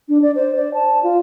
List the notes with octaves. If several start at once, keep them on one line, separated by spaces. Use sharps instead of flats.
D4
D5
C5
D5
A5
F4